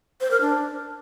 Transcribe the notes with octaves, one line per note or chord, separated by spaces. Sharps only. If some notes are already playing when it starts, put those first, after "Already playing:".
C5
A#4
D4